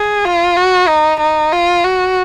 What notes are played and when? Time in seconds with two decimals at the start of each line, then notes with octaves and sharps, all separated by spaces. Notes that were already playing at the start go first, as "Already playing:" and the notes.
Already playing: G#4
0.25 F4
0.57 F#4
0.88 D#4
1.20 D#4
1.52 F4
1.84 F#4